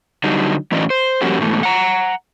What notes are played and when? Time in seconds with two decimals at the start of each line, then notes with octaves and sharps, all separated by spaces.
0.24 D3 F#3 G3 D4 D#4
0.72 A2 E3 F#3 C#4 D5 D#5
0.90 C5
1.22 F3 G3 A#3 C#4 F#4 G4
1.39 G#2 B2 E3 A3
1.63 F#5 A#5